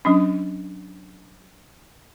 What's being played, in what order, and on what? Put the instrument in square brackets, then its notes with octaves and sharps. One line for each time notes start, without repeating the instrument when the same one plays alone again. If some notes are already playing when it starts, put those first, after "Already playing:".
[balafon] F#3 C#4 D4